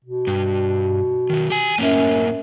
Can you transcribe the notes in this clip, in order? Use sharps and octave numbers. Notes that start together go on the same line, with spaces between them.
B2
G2
D#3 F#3
G4 G#5
F#2 A2 A#3 C#4